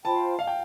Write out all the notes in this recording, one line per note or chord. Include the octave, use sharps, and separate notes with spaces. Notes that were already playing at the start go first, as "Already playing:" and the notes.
F4 C5 G5 A5 B5
F5
G5